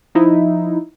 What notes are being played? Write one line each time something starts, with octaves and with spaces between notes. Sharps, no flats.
F3 D#4 E4